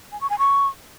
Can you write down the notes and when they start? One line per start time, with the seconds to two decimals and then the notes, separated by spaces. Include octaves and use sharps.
0.12 G#5
0.21 C#6
0.30 G#5
0.39 C#6